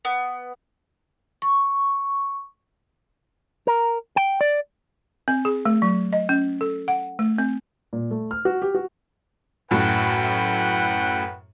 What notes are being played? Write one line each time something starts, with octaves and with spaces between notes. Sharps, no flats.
B3
C#6
A#4
G5
D5
C4
G#4
A3
F#3
D#5
C#4
A4
F#5
A3
C4
A#2
A3
F6
F#4
G4
F#4
F#2 A2 B4 F#5 G5